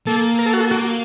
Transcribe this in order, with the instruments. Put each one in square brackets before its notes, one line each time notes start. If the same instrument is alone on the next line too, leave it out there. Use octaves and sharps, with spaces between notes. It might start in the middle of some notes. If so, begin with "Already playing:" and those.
[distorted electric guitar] A#3 [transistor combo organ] A4
[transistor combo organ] A#4
A4
F#4
A4
[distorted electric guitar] A#3 [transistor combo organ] F#4